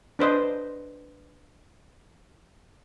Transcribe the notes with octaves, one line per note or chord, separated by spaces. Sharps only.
D4 B4 C5 D#5